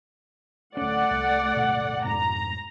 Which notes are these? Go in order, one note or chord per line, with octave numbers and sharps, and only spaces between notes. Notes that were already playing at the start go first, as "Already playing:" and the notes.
D1 A3 C#4 D5 F#5
C2
D1 G1 B2
F2 G#2 B2 A#5